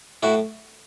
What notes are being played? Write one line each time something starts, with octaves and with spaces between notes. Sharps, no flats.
A2 E4 F#4